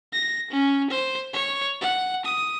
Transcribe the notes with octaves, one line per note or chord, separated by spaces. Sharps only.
A#6
C#4
C5
C#5
F#5
D#6